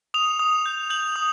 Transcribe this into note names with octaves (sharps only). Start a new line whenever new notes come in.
D#6 F7
D#6
G6
G6 F#7
D#6